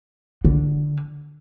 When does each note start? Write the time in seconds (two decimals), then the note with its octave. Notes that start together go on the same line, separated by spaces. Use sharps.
0.45 D3